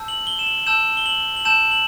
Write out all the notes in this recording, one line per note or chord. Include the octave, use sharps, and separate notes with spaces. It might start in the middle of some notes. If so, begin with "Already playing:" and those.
Already playing: A5 E6 G6
F#7
G7
E7
F#7
A5 E6 G6 E7
G7
F#7
F#7
A5 E6 G6 E7
F#7